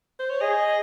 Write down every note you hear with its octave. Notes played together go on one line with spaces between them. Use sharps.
C5
C#5
G#4 D#5